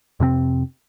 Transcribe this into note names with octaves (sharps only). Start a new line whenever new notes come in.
F2 C3 A#3 C4